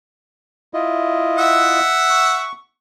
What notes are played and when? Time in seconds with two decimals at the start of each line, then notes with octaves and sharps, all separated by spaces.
0.74 E4 F4 D#5
1.38 E5 F#5
2.10 C#6